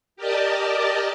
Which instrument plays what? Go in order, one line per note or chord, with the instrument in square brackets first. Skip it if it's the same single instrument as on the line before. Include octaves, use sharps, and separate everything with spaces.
[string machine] G4 A#4 D5 D#5 A5